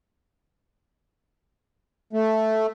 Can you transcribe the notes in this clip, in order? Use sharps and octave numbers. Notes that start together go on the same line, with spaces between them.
A3